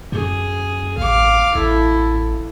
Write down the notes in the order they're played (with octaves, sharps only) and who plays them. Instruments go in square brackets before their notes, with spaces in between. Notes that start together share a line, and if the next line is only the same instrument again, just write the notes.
[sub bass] F#2 [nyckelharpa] G#4
[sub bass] A1 [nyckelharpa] F5 D6
[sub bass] A1 [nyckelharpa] E4 A4